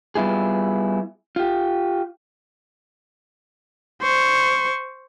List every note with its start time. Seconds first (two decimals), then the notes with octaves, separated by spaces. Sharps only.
0.15 G3 B3 E4 F4 G#4
1.36 F4 G4
4.02 C5 C#6